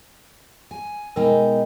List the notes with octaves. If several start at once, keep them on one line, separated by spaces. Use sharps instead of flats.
G#5
B2 G#3 D#4 A#4 G5 G#5